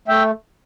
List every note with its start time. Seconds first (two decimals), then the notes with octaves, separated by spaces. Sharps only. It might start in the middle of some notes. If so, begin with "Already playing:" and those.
0.08 A3 E5 G5